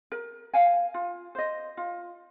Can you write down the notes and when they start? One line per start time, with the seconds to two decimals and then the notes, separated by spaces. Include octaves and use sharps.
0.12 A#4
0.53 F5 G#5
0.94 F4
1.35 C5 D#5
1.77 F4